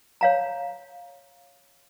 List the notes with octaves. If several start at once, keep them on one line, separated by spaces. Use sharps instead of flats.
C#5 F5 A#5